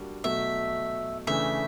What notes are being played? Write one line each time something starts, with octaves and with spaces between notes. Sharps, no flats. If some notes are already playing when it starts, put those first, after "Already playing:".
Already playing: G3 A#3 D4 F#4 A#4
B2 F#3 A3 E5
C#3 E3 A3 D4 E5